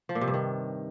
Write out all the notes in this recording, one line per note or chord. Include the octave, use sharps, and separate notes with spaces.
F3
A#2
C3
G2
D#3